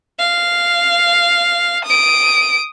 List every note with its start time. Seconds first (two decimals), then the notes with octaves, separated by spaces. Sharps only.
0.19 F5
1.85 D#6 D7